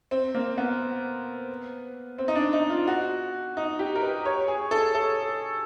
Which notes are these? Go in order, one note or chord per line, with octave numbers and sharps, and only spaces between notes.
C4
A#3
B3
C4
D#4
D4
D#4
F4
F#4
D#4
G4
A#4
B4
C#5
G#4
A4
A4